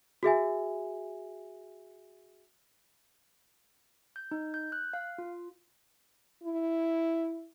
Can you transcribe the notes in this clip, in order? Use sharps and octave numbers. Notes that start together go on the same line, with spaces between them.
F#4 G#4 E5 G#5
G6
D#4
G6
F#6
F5
F4
E4